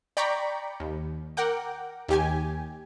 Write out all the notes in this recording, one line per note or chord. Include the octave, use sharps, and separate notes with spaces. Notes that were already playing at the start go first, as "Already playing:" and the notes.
D5 G5 A#5 B5 C#6
D#2
A#4 F#5 G5 D6
D#2 G4 G#5